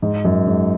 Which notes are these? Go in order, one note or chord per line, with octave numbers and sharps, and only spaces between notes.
G#2
F#2
G#2